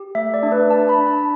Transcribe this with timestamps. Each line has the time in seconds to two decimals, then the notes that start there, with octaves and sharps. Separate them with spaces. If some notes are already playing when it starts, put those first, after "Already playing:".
Already playing: G4
0.15 A3 E5
0.34 D5
0.43 D4
0.52 B4
0.70 D4 A5
0.89 B5
0.99 D4
1.07 A5